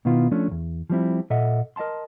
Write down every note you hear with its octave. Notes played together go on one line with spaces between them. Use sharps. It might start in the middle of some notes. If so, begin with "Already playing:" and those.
B2 D#3 B3 E4 F4
F3 A3 C#4 D4
B1 E2
F3 G3 C4 E4
A#2 A4 D#5 E5 F#5
A#4 D#5 F5 A5 C6